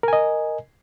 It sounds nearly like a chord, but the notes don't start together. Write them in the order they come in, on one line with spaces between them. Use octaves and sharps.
A#4 G#5 D#5